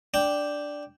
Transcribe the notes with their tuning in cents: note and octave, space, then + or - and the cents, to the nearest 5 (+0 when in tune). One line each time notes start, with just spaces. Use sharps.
D4 +0 G5 +0